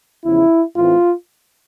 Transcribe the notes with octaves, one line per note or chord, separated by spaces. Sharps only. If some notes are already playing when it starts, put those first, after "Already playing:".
E2 C#3 F3 E4
A2 E3 A3 C4 F4